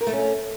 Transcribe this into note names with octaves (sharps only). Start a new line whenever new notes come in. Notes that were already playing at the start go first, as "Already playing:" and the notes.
A#4
A3
C#4